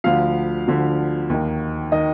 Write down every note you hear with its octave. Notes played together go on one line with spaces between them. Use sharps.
D2 D3 F3 F5
D2 D3 F3
D#2 D#3
D#3 D#5